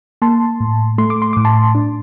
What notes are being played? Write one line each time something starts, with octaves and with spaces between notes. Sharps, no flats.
A#3 A5 C6
A2
A3 C6
D6
C6
A2 D6
A5 C6
D4